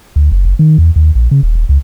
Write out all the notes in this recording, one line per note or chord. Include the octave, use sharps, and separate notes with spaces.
D2
F#1
F#1
D#3
E2
D#2
A#1
C#3
D#1
D#1
C#2